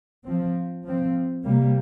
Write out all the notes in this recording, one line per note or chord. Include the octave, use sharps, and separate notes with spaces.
F3 C4
F3 C4
C3 G3 A#3